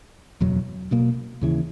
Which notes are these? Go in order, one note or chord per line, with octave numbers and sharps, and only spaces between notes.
F#1 E2 B2 F#3
B1 B2 A#3
D#2 C#3 E3